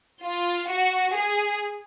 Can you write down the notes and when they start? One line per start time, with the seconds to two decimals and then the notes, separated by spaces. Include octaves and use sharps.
0.24 F4
0.69 F#4
1.16 G#4